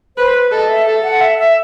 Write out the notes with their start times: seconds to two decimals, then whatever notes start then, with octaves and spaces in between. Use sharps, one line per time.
0.17 B4 C5
0.34 B4
0.51 A4 D#5
0.69 E5
0.86 A4
1.04 F#5
1.21 E5
1.38 E5